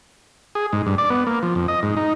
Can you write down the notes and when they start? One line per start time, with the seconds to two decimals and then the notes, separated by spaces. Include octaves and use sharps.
0.55 G#4
0.73 G#2
0.86 G2
0.98 D5
1.10 B3
1.27 A#3
1.43 F3
1.55 F2
1.68 D#5
1.83 G#2
1.97 D#4